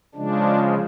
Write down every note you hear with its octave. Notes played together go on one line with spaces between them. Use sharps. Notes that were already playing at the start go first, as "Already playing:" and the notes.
C#3 F3 G#3 D4